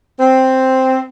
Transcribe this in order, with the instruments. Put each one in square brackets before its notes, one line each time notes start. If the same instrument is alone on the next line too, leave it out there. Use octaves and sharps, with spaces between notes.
[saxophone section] C4